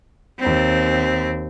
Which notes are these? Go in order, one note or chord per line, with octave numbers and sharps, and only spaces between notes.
D#2 C4